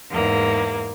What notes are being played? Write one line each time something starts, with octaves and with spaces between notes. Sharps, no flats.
E2 G#2 A#3